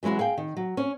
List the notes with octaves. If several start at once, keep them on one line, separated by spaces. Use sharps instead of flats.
E3 F#3 G#3 E4 F#4
G#4 F5 G5
D#3
F#3
C#4 C#5